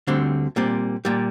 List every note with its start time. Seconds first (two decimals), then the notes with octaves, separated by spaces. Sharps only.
0.07 D2 D3 G3 C4
0.56 A#2 G3 C4
1.05 A#2 G3